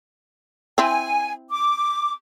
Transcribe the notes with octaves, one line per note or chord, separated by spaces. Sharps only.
C4 E4 G#5
D6